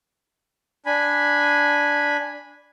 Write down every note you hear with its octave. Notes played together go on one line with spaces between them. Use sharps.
D4 G#5 B5